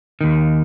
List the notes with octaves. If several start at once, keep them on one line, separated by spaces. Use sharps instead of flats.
D#2 D#3